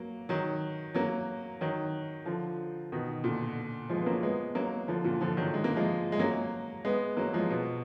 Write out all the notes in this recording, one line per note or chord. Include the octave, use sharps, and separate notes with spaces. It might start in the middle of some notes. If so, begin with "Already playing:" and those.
Already playing: F#3 A#3
D#3 F#3
F#3 A#3
D#3 F#3
D3 F3
B2 D#3
A#2 D3
F3 G#3
B3
F#3 A#3
G#3 B3
F#3 A#3
D3 F3
A#2 D3
D3 F3
D#3 F#3
G#3
A#3
F3 G#3
G#3
F#3 A#3
G#3 B3
F#3 A#3
F3 G#3
B2